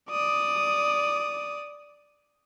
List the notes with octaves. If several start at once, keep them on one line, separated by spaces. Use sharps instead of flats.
D5 D#6